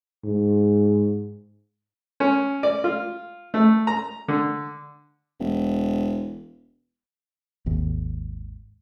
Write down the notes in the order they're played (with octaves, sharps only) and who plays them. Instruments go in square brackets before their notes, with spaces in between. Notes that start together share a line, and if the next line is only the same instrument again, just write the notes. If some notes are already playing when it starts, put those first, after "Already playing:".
[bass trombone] G#2
[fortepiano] C#4
D5
F4
A3
A#5
D3
[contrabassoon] E1
[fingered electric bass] G#1 D#2